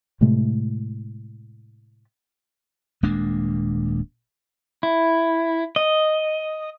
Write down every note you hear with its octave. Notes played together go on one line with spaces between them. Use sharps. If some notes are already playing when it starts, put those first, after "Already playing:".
A2 C3 G#3 A3
D#1 G#3 A#3 D4
E4
D#5